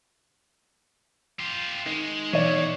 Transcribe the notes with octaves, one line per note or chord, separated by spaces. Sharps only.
F4 G4
D#3 G#3
B2 E3 C#5 D5